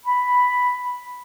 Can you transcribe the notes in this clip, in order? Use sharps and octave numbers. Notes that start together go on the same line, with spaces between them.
B5